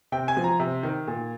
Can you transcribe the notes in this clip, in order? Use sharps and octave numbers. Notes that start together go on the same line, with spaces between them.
C3 G5
G#5
F3
A#5
C3
D#3
A#2